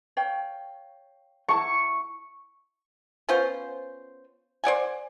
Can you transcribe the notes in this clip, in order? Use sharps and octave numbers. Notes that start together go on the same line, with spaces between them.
C#5 F5 G5
E4 A5 C#6
B3 C#4 F4 C5
C5 D5 F#5 G#5